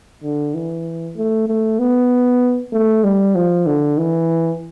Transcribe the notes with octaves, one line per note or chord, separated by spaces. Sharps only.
D3
E3
A3
A3
B3
A3
G3
F3
D3
E3